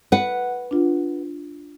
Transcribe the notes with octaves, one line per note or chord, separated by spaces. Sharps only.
B4 F#5
D4 F4